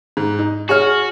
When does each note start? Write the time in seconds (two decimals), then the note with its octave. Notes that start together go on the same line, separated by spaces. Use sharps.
0.17 G#2
0.39 D#4
0.69 F#4 G#4 C#5 F6